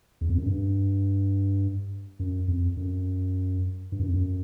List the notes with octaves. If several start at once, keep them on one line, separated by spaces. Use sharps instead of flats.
E2
F2
F#2
G2
F#2
F2
F#2
G2
F#2
F2
F#2